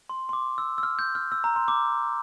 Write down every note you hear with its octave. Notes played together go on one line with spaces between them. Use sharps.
C6
C6
D6
E6
E6
F6
G6
F6
E6
A#5
C6
D6